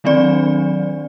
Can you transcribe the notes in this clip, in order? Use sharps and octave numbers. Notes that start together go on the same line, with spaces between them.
D#3 F#3 C4 D4 D5